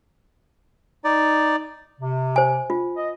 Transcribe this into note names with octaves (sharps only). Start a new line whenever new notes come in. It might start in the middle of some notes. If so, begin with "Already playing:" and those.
D#4 D5
C3
C5 G#5
F4
D#5